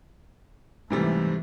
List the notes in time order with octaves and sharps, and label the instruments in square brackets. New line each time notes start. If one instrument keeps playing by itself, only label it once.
[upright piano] G#2 C3 G3 [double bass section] E3 A3